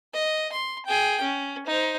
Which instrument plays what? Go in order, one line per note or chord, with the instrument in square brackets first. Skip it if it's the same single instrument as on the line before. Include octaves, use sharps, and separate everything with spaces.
[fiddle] D#5
C6
G#4 G5
C#4
D#4 C5